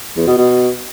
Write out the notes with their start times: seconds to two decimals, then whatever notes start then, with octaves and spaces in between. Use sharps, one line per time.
0.16 E2
0.27 B2
0.37 B2